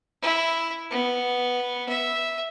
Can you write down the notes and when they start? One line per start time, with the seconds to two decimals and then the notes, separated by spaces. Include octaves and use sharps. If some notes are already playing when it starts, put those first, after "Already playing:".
0.22 E4
0.91 B3
1.89 E5